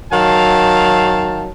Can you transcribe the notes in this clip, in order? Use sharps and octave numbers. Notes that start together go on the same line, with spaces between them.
D#3 F#3 F5 A5